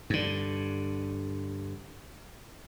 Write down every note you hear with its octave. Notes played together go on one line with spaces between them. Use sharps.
G2 D3